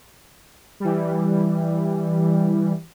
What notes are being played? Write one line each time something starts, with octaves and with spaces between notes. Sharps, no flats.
E3 G3